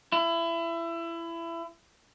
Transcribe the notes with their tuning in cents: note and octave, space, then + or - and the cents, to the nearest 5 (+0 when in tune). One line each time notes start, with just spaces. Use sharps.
E4 +25